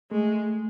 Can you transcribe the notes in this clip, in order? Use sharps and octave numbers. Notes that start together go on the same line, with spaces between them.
G#3 A3